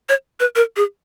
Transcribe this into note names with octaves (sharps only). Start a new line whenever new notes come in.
C#5
B4
A#4
G#4